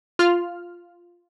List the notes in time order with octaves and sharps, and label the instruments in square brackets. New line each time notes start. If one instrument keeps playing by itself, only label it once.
[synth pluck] F4 F6